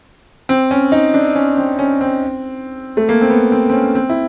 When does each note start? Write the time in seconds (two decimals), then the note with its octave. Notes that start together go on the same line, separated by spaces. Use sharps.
0.49 C4
0.71 C#4
0.92 D#4
1.14 D4
1.36 C#4
1.57 C4
1.79 C#4
2.01 C4
2.97 A3
3.09 A#3
3.21 C4
3.30 B3
3.52 C4
3.69 C4
3.74 C#4
3.95 C4
4.10 E4